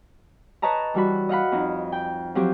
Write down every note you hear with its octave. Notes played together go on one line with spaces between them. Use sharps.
B4 C#5 D#5 A5 A#5
E3 G3 F#4 B5
D#5 F5 F#5 B5
F2 D#4
G5
F3 F#3 C4 G4